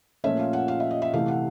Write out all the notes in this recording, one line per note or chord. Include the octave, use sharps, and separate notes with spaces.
A#2 F3 A3 C#4 E5
F5
F#5
F5
E5
D#5
E5
C3 E3 A3 F5
F#5